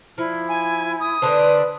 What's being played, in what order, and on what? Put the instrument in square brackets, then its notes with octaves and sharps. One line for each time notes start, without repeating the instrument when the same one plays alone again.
[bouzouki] F3 [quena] E4
[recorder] G#5
D#6
[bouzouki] D3 D4 C5 [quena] B4